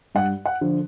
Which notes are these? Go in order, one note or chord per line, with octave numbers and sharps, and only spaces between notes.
G2 F#5
F#5
D3 F3